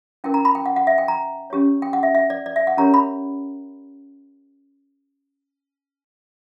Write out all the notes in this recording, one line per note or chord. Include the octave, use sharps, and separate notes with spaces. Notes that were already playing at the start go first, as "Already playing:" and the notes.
C#4 E4 A#4 G5
A#5
B5
G5
F#5
F#5
E5
G5
A#5
C#4 G4 C#5
G5
F#5
E5
E5
D5
D5
E5
F#5
C#4 G4 A#4 C#5 A#5
B5